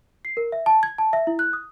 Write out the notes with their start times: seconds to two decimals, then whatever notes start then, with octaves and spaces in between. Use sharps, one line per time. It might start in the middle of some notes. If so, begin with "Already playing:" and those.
0.25 C7
0.37 A#4
0.52 E5
0.66 A5
0.83 G#6
0.98 A5
1.13 E5
1.27 E4
1.39 F#6
1.53 D#6